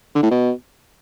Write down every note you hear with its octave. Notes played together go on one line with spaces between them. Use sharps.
D3
A2
B2